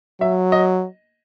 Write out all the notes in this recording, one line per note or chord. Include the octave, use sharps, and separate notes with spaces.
F#3 E5
D#5